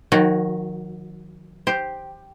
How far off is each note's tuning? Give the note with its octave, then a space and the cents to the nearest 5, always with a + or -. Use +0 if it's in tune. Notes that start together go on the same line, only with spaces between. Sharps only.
D#3 +0 F#3 -35 F#4 +0
G4 +0 C5 +0